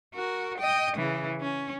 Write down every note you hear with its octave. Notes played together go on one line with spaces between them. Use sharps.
F#4 A#4
D#5 G5
C#3 E3
C#4